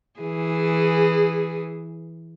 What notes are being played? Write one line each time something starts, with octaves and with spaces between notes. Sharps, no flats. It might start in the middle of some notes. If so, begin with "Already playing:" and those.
E3 G#4